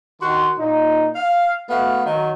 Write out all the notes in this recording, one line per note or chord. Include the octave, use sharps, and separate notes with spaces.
D#3 F#4 C6
A#2 D#4
F5
A3 B3 F#4 F5
D#3 F#3